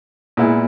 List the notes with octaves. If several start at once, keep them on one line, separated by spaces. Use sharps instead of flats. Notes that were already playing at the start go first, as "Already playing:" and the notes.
A#2 G#3 B3 E4